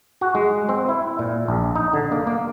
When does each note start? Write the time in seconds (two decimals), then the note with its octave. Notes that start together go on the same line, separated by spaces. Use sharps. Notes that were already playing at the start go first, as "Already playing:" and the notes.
0.21 F#4
0.35 G#3
0.69 C4
0.89 E4
1.19 A#2
1.48 A#1
1.76 D#4
1.93 D3
2.12 A#3
2.27 A#3